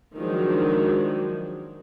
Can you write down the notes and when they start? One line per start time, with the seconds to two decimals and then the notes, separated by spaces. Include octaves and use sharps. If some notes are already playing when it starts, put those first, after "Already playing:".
0.17 D#3 F3 F#3 G#3 D4